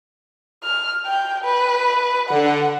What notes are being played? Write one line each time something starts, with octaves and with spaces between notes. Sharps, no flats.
F6
G5
B4
D3 F#5